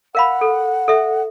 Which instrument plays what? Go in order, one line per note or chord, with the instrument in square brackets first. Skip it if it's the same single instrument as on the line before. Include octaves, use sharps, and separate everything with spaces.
[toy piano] A#4 F5 B5 [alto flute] F#5
[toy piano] A4
A4 E5